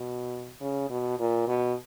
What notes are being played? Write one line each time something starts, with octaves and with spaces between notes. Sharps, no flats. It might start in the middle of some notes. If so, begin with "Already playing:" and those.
Already playing: B2
C#3
B2
A#2
B2